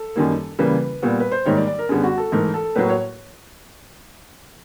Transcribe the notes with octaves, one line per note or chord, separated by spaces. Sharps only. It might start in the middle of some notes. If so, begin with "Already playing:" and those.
Already playing: A4
F#2 D#3 G3 A#3
C#3 E3 G3 A#3 B4
A#2 G3 B3
B4
C5
G#2 D#3 G3 A#3 C#5
D5
D5
A#4
F#2 D3 G3 B3 G#4
F#4
A4
G#2 E3 A3 A#4
A4
A2 F#3 A#3 B4
C#5